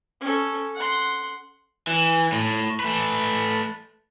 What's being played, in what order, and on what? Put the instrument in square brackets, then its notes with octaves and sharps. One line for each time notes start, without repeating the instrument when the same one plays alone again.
[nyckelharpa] C#4 A4
F#5 C6
[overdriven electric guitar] E3
A2
A3 B4